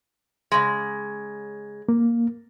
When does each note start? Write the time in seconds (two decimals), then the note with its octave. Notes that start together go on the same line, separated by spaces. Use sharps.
0.52 C#3 G#3
1.89 A#3